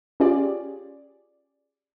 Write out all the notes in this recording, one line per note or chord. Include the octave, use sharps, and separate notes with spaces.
C#4 F4 G4 G#4 D5